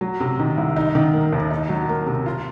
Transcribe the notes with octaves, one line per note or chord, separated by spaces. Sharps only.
F#3
C3
D#3
C2
D#4
D#3
A#3
D#2
D#4
F#3
A#3
C3
F4